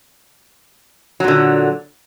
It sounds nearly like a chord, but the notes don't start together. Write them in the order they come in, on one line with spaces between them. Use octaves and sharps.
F#3 A#2 D3